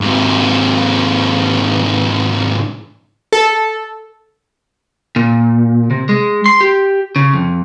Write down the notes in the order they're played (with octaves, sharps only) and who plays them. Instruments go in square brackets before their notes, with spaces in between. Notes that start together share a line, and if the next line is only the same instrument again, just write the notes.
[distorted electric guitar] G#2 C3
[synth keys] A4
[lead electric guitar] A#2
C3
G#3
C6
G4
C#3
F2